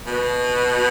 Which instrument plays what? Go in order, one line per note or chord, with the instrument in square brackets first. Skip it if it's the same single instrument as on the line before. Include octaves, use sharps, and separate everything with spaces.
[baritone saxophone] B2